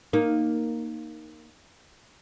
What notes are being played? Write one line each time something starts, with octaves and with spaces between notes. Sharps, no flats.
A#3 D#4